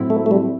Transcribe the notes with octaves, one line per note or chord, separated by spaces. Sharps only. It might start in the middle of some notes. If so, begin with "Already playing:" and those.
Already playing: A2 F#3 C4 E4
A3
A3
G3